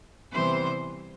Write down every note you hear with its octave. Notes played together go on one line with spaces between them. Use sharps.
C3 E3 G3 B3 C5